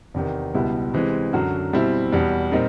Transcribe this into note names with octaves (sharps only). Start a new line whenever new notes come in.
E2 C3 D#3
C#2 B2 G3 B3 E4
C3 E3 G#3 C4
F#2 D3 F#3
B2 G3 C4 E4
E2 B2 G3
A#2 G3 C4 D#4